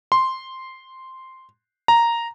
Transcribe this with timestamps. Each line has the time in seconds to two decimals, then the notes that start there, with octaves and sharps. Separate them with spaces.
0.12 C6
1.88 A#5